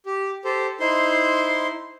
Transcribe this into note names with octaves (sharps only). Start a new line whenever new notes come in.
G4
G4 A4 C5
D#4 E4 C5 C6